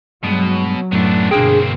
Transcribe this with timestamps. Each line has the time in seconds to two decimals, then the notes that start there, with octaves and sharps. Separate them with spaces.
0.24 G2 B2 F#3 G#3
0.92 F#2 A2 A3 B3 D4
1.31 G1 B2 A#3 C4 D4 G#4 G5